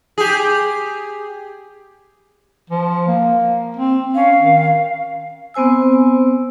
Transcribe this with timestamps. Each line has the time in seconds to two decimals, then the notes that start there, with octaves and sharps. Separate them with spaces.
0.18 G4 G#4
2.70 F3
3.08 A#3
3.77 C4
4.15 C#4 F5
4.39 D#3
5.54 B3 C4 C5 G#5 E6